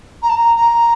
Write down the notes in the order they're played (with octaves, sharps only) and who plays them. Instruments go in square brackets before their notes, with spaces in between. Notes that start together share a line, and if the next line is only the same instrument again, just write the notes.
[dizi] A#5
A5
A#5
A#5